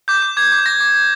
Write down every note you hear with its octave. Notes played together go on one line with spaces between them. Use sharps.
D6 G6
D6
D6 G#6
D6
D6 A#6
D6
D6